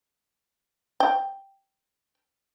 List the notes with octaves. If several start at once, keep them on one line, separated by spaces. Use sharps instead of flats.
G5